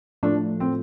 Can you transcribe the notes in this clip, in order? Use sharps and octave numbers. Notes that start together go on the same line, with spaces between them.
A2 F3 A3 D4
C4